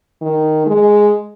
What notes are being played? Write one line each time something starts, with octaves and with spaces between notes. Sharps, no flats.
D#3
G#3